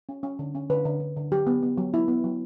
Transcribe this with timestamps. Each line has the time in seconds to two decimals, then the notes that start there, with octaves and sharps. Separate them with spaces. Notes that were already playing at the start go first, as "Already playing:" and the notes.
0.09 C#4
0.23 C#4
0.39 D3
0.55 C#4
0.70 D3 B4
0.85 D3
1.00 D3
1.16 D3
1.32 F#3 G4
1.47 B3
1.63 B3
1.78 F#3
1.94 B3 E4
2.08 B3
2.24 F#3